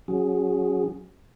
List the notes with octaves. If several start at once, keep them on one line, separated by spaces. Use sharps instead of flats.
F#3 C#4 F#4 G#4